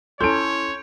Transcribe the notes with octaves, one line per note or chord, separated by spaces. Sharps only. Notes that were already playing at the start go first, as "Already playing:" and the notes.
C#4 E4 A4 C#5 C6 G6 D7